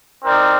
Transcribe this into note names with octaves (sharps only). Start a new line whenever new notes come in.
C4 D#4 A#4 D5